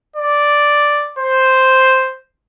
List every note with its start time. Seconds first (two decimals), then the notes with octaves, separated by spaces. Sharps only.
0.16 D5
1.19 C5